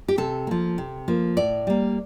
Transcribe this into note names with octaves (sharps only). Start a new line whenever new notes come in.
G4
C3 A4
F3 A#3
C3
F3 A#3
A2 D5
G3 A#3